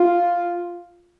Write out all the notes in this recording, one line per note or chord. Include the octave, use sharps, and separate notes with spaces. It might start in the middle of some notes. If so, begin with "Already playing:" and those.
Already playing: F4